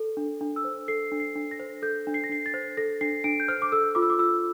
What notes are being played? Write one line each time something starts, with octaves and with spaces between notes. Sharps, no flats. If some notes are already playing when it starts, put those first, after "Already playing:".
Already playing: A4
D4
D4
E6
C5
A4 C7
D4
C7
D4
A#6
C5
A4 G6
D4
C7
A#6
D4 C7
A6
C5
A4 A#6
D4 C7
D4 D7
G6
C5 F6
D6
A4 E6
F4 D6
E6
D6
F4 E6